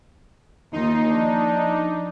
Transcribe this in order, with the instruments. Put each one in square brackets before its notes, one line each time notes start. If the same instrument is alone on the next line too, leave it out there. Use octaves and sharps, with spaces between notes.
[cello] D#2 F4 [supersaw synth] D#4
[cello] F3 [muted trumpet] D4